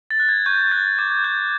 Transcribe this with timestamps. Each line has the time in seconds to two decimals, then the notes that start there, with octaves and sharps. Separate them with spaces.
0.11 A6
0.19 F#6
0.29 G#6
0.46 C#6 G6
0.72 F#6 A6
0.98 D6 G#6
1.24 G6